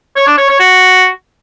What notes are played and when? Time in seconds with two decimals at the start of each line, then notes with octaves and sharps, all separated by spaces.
0.16 C#5
0.27 D4
0.38 C#5
0.49 C#5
0.60 F#4